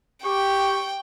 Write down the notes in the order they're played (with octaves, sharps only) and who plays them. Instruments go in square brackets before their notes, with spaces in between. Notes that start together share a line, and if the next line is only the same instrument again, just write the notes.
[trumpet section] G4 [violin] G5 [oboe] C#6